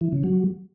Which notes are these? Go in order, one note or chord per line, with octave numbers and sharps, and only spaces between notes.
E3
C#3
F#3